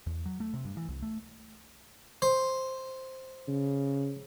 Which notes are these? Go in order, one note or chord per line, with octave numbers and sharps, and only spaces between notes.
E2
F#3
A3
C3
G2
E3
C2
A3
C5
C#3